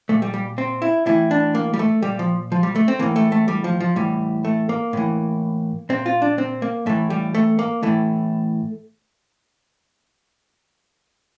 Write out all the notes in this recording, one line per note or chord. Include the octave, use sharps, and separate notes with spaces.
A#2 A3
G3
G3
C4
E4
A2 E3 E4
D4
A#3
G3
A3
A#2 G3
F3
F3
G3
A3
C4
A2 E3 A#3
A3
A3
G3
F3
F3
A2 E3 G3
A3
A#3
A2 E3
A#2 C4
F4
D4
C4
A#3
A2 E3 A3
G3
A3
A#3
A2 E3 A3